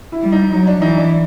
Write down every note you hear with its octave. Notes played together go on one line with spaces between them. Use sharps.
E4
G3
D#4
F#3 D#4
D4
E3 D#4
D4